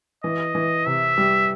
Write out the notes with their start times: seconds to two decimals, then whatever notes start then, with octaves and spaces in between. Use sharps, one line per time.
0.23 E3 D#5
0.55 E3
0.86 C3 E5
1.18 G3